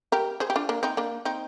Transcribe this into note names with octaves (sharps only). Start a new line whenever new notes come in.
G4 A#4
G#4 C5
G4
D4 F4
A#3 D4
C4 D#4
A#3 D4
C4 D#4